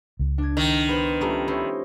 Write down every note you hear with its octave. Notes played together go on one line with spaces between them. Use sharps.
C#2
D4 G#6
D#3
B3 C5
G3 A3 C#4 D#4 F4
E4 C5 C#5